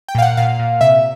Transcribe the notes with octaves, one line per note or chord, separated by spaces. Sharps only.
G5
A#2 F5
F#5
A#2 F5
A#2
C3 E5